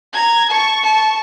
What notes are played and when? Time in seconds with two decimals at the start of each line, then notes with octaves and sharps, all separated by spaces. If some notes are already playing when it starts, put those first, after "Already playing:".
0.13 A#5 G#6
0.49 A5 C#6
0.84 A5 C#6